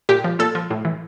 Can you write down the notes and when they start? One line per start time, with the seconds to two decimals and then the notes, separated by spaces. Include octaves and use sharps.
0.09 A#2 G4
0.24 F3
0.39 A#2 A4
0.55 F3
0.70 A2
0.85 E3